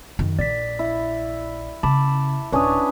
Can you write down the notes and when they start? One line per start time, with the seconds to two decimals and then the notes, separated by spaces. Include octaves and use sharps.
0.19 F#2 D#3
0.39 A#1 D5 B6
0.79 E4
1.83 C#3 A5 B5 D6
2.52 D#1 C#4 D4 B4 C#5 D#6